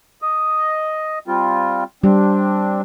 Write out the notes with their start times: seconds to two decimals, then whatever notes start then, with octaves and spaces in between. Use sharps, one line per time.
0.22 D#5
1.28 G3 C4 F4
2.04 G3 C4 D4